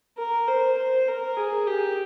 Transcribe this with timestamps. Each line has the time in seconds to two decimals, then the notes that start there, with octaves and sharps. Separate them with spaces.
0.18 A#4
0.47 C5
0.77 C5
1.07 A#4
1.37 G#4
1.67 G4